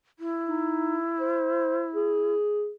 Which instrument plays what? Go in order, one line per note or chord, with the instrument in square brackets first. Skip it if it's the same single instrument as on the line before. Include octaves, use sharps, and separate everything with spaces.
[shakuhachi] E4
[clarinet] D#4
C5
G#4